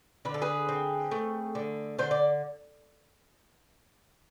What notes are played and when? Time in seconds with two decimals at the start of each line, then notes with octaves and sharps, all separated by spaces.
0.25 D3 B4
0.34 A4
0.42 G#4 B4
0.69 C4
1.11 A3
1.55 D3
1.99 D3 C5
2.11 D5